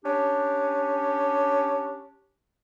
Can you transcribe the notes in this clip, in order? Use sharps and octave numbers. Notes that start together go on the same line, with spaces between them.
C#4 D4 G4